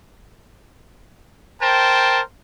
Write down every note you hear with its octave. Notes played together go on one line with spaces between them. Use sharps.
A#4 C5 G5 A5